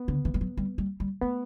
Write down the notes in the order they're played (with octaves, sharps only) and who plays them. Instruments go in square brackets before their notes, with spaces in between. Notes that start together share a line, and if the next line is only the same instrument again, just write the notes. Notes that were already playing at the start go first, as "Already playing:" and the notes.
Already playing: [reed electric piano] B3
[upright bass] D3
E3
G3
F#3
G3
G3
G3
[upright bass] A3 [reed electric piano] B3